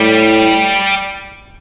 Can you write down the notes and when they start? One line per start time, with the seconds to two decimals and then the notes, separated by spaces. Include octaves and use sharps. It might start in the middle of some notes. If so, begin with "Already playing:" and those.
Already playing: A2 G3